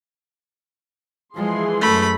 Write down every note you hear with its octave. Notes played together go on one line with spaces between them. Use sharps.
E3 F3 G#3 G#4 C6
F#2 A3 B5